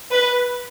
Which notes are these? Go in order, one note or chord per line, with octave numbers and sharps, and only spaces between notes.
B4